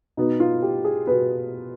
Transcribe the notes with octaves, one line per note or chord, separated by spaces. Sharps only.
B2 B3 D#4
F4
G4
G#4
B2 B3 B4